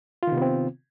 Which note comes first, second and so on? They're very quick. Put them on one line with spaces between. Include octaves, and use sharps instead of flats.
F4 D#3 C3 B3 C4